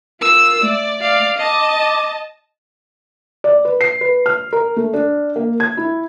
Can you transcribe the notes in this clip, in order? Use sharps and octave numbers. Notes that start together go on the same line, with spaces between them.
F4 A#4 E6
A3 D5
D5 F5
D#5 A5 D6
D5
B4
C7
B4
F6
A#4
A3
D4
A#3
G#6
E4